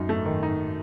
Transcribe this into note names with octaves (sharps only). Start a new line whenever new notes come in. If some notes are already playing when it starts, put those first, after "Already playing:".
Already playing: F#2 D#4
A3
D#3
D#4